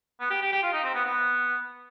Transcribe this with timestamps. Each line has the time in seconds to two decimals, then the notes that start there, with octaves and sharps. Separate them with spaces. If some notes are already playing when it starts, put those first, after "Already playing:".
0.20 B3
0.30 G4
0.42 G4
0.52 G4
0.63 F4
0.73 D#4
0.84 C4
0.94 B3
1.04 B3